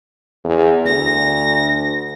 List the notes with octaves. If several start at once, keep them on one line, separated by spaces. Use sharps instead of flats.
E2
D2 A#6